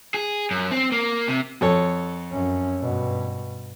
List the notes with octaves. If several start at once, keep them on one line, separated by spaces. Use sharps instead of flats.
G#4
F#2
C4
A#3
C3
F2 A4 C#5
F#2 C#4
G2 B2